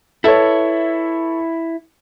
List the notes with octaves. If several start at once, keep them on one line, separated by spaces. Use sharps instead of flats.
E4 A4 B4 C#5 E5